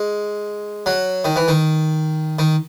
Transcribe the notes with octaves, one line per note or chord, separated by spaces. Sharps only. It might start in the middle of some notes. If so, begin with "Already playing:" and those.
Already playing: G#3
F#3
D#3
E3
D#3
D#3